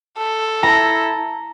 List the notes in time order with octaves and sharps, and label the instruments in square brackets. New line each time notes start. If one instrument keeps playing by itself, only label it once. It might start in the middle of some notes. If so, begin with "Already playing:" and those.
[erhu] A4
[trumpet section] E4 A5 [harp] A#5